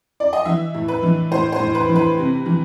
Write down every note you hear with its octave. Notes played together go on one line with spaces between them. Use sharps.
D5
D#5
E3 E5
A2
B4
E3
A2 C5
C5
A2
B4
E3
B4
C3
E3